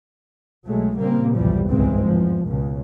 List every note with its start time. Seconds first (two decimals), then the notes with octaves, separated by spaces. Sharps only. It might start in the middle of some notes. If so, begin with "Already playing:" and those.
0.65 B1 F#3 G#3 A3
0.97 A#2 C#3 G3 A#3 C4
1.35 B1 E2 G2 E3 F3 G3
1.70 G1 C#2 G#2 E3 G#3 C4
2.04 E2 F3
2.45 C#2 B2